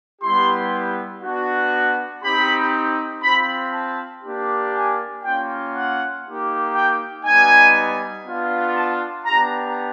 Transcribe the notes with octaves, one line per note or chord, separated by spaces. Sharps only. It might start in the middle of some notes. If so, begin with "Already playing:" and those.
G3 B3 E4 G4 C6
B3 D4 F#4
C4 D#4 G4 B5
C4 F4 B5
A5
A#3 D4 G4
G#5
A#3 C#4 F4 G5
F#5
A#3 D#4 G4
G5
G3 B3 D#4 G#5
B3 D4 F4
A5
B3 D4 G4 A#5